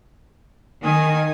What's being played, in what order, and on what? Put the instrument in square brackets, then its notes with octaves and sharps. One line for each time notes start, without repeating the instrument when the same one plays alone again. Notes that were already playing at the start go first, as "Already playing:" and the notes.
[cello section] D#3 [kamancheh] G#5 D#6